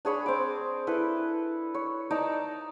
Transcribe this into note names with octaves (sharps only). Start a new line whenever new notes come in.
D4 G#4 C#5 B5
C4 D6
E4 A4 B4
C#5
D#4 D5 A5 A#5